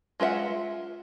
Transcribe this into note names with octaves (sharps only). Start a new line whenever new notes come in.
G#3 F4 A#4 E5 F#5